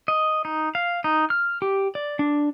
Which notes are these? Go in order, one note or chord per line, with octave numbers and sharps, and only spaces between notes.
D#5
D#4
F5
D#4
F6
G4
D5
D4